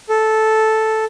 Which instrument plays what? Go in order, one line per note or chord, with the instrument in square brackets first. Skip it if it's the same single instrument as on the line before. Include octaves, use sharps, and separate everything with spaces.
[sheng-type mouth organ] A4